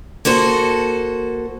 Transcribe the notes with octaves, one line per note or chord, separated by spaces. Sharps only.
A#3 F#4 A4 C5